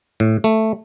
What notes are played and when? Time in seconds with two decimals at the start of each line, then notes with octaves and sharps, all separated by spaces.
0.20 A2
0.44 A3